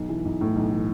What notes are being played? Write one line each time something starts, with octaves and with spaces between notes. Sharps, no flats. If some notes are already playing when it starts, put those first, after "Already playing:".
Already playing: B1
E3
B1
A2
B1
E3